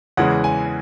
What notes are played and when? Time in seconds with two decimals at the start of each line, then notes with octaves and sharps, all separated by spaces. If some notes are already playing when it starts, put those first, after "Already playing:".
0.17 E2 C#3 E3 G#3 F#5
0.44 G#5